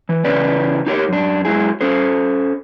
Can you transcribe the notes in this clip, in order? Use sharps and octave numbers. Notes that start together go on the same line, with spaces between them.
E3
C#3 E3 C#4 E4 B4 D5
D#4 G4 A#4 C#5
F#2 D4
F#3 G#3 E4 G#4
C#4 A4 C5